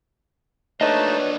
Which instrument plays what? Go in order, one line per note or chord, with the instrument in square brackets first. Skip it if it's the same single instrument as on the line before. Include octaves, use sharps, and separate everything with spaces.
[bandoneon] A3 D#4 A5 [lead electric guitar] A#3 D4 [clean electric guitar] B4 D#5 [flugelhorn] C#5